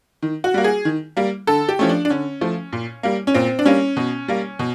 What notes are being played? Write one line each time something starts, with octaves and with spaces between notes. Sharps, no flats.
D#3
F#4
G3 A#3
G#4
D#3
G3 A#3
D3 A4
G4
F3 A3 C#4
D4
D4
D3 C#4
F3 A3
A#2
G3 A#3
C#4
A#2 C4
D4
G3 A#3 C#4
B2
G3 A#3
B2